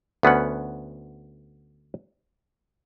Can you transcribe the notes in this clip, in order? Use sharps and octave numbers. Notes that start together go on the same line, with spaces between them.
D2 B3 C#4 F#5